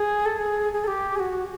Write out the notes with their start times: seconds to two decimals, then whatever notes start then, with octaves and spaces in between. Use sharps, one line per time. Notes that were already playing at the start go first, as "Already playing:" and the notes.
Already playing: G#4
0.26 A4
0.37 G#4
0.73 G#4
0.84 A4
0.87 G4
1.16 G#4
1.19 F#4